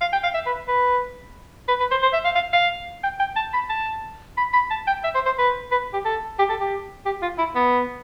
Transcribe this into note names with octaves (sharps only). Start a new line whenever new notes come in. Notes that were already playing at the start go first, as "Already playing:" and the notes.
F5
G5
F5
E5
B4
B4
B4
B4
C5
C5
E5
F5
F5
F5
G5
G5
A5
B5
A5
B5
B5
A5
G5
E5
C5
C5
B4
B4
G4
A4
G4
A4
G4
G4
F4
E4
B3